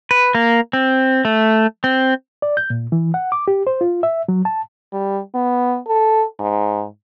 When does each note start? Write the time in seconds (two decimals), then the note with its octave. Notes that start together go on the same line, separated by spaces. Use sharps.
0.11 B4
0.35 A#3
0.73 C4
1.25 A3
1.84 C4
2.42 D5
2.57 G6
2.70 A#2
2.92 E3
3.14 F#5
3.32 D6
3.48 G4
3.67 C5
3.81 F4
4.03 E5
4.29 F#3
4.45 A5
4.93 G3
5.34 B3
5.87 A4
6.39 G#2